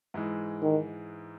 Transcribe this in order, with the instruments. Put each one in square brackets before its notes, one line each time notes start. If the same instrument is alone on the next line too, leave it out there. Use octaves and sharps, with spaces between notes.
[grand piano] G#2 E3 G#3
[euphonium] D#3